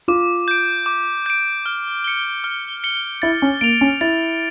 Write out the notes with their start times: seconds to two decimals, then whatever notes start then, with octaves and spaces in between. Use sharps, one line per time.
0.08 F4 D6
0.48 G6 D7
0.86 D6
1.26 G6 D7
1.66 F6
2.04 C#7 G7
2.44 F6
2.84 C#7 G7
3.22 E4 A6
3.42 C#4
3.61 A#3 D7
3.64 F7
3.81 C#4
4.01 E4 A6